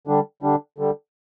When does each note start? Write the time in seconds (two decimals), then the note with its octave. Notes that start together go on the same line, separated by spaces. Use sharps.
0.07 D3 G3 D4
0.43 D3 G3 D4
0.78 D3 G3